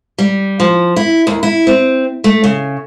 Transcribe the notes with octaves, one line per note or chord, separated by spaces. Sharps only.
G3
F3
E4
D#2
E4
C4
A3
C#3